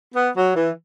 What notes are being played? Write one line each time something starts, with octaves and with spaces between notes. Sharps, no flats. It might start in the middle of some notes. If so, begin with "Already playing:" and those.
B3
F#3
E3